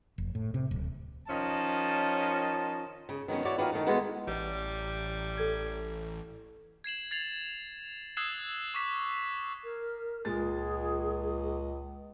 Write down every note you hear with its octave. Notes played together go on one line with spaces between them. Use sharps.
F1
A2
C3
D1
D#3 F3 C#4 D#5 A5
C#3
D#3 F#3 B3 C#4
E4 F#4 C#5 D5
D#3 A#3 F4 F#4 B4
D#3 A3
G#3 B3 E4 F#4 A4
A1 G3
A4 G#6
G#6 C7 E7 F#7
G#6 A6 C7 F7 F#7
D#6 E6 F#6 G#6 C7 E7
C#6 D6 B6 E7
A#4
C#2 A#2 G#3 G#4 A6